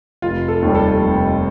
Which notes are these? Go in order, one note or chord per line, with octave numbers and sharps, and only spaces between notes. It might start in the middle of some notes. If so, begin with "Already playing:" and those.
F1 F4
A4
D#2 D#3 G3
A4
F1